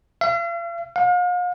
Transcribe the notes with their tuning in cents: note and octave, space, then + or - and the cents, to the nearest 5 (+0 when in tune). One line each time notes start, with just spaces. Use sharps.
F5 -45
F5 +40